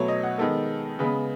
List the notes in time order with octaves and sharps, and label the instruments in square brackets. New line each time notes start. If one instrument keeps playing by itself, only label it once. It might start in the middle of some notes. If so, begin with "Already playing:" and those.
Already playing: [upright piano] B2 F#3 A3 B4 C#5
D#5
F#5
D#3 G#3 B3 A4
C#3 G#3 B3 B4